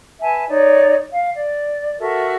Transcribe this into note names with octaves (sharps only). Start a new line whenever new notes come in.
B4 E5 G#5 A5
D#4 C#5 D5
F5
D5
F#4 A4 A#4 E5